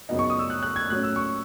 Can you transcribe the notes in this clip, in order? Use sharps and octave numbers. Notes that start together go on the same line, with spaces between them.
F#2 C#3 F#3 B3 D#4
C#6
D#6
E6
F#6
F#6
G#6
A2 F#3 C#4 F#6
E6
C#6